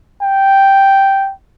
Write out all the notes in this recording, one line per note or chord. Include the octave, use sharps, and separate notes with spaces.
G5